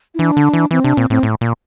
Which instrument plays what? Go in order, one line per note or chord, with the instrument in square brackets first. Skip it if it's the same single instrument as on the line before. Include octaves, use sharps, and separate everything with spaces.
[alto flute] E4
[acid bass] E3 [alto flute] D4
[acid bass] D3
E3
[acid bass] E3 [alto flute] C4
[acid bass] C3 [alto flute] D4
[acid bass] A#2 [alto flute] C4
[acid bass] A2 [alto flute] C4
[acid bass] A2
A#2